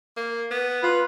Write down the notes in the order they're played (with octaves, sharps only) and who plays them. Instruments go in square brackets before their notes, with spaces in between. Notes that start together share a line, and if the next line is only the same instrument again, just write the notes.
[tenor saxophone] A#3
B3
[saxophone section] F4 B4